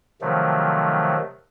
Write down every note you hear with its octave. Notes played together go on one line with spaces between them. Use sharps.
C3 D#3 F3 F#3 A3